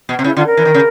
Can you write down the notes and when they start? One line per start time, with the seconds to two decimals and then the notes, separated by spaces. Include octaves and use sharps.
0.09 B2
0.19 C3
0.24 C#3 E4
0.36 D3 F4
0.46 A#4
0.57 E3
0.65 D#3
0.74 C#3